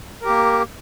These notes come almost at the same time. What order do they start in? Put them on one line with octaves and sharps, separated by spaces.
A#4 G4 A#3